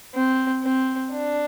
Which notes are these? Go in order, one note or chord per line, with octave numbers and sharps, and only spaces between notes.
C4
C4
D4